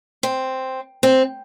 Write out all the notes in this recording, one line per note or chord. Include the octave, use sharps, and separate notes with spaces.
C4
C4